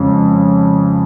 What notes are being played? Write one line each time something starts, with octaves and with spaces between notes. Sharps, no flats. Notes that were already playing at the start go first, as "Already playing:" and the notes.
Already playing: F2 C#3 G#3